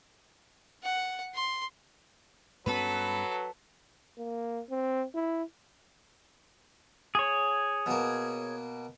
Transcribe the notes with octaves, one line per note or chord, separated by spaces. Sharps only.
F#5
C6
G2 F#3 B3 C#4 A4 B4 B5
A#3
C4
E4
G#4 C#5
B2 A#3